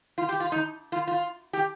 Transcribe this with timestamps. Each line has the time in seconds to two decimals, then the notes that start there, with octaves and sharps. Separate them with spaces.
0.18 F4
0.29 G4
0.40 F4
0.52 D#4
0.92 F4
1.08 F4
1.53 G4